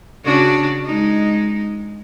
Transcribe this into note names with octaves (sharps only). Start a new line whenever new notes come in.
C#3 D4 F#4
G#3 D#4